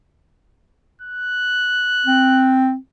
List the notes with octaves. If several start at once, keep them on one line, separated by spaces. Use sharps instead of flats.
F#6
C4